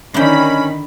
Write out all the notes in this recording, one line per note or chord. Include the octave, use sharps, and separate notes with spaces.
D3 D#3 C#4 E4 G5 B5